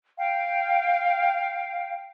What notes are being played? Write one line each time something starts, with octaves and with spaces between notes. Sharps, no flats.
F5 G5